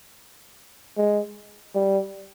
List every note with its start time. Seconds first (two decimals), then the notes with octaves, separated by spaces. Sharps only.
0.97 G#3
1.75 G3